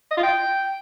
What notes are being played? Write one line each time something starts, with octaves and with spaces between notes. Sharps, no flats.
D#5
F4
G5